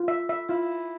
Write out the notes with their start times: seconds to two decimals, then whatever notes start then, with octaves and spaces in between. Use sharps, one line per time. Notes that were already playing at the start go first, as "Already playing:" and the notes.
Already playing: F4
0.08 E5
0.29 E5
0.49 E4 F4